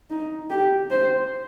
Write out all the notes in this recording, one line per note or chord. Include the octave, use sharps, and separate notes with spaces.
D#4
G4
C5